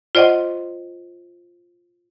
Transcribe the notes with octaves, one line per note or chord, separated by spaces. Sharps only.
F4 C5 D5 D#5 F#5